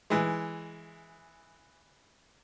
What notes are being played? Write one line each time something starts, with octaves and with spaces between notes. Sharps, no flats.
E3 G#3